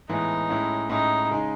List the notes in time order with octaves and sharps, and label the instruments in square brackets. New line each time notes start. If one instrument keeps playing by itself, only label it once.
[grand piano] A2 E3 G#3 B3 [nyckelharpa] D#4
[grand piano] A2 G#3 C#4 E4
[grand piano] A2 G#3 C#4 E4 [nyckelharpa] D#4
[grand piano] C#3 G#3 D#4